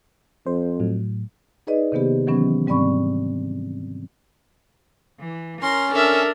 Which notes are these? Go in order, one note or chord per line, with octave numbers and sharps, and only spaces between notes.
F2 C5
A2 F#3
D#4 G#4 B4 D5 D#5
C3 D#3 A#3 B3 G4
D#3 E3 F#3 B3 C#4
G#2 G3 C4 D5 B5 C#6
E3
C#4 A#4 C6
D4 A4 A#4 E5